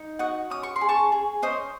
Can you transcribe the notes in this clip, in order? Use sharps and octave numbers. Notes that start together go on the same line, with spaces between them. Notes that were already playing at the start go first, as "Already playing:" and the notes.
Already playing: D#4
F#4 D#5 F#5
C#4 D#6
C#6
C6
G#4
A5 C#6
G#4
C#4 C5 D#5